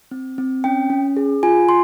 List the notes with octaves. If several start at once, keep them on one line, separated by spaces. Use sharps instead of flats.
C4
C4
C#4 G5
C#4
G#4
F4 G#5
C6